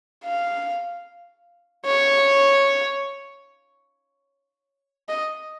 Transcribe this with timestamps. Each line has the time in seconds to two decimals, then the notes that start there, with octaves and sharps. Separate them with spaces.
0.25 F5
1.86 C#5
5.09 D#5